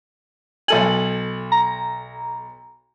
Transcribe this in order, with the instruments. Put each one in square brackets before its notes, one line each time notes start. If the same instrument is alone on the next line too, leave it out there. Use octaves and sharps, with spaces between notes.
[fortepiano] B1 A4 G#5 [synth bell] F#7
[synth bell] A#5